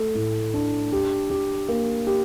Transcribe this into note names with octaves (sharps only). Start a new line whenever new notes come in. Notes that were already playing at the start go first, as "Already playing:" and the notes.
Already playing: A3 A4
A2
D4
G4
G4
A#3
G4